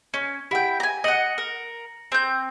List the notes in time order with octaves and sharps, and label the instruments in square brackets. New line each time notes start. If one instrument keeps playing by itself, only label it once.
[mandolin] C#4 [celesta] G#6
[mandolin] E4 G5 [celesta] G4 F#5
[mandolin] G#5 A#5
[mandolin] D#5 F#5 [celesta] A#6 C#7 F#7
[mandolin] A#4
C4 G6